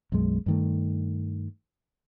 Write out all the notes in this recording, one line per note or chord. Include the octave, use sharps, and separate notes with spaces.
B1 F#2 G#3
G2 D#3 A3